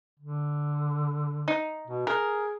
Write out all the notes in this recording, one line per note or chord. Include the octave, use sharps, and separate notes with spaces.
D3
D#4
B2
G#4 A#4